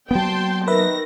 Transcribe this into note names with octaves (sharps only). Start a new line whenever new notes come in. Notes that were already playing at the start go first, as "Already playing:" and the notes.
F#3 A#3 B3 G5 A5 C6
D#3 B4 E5 A#6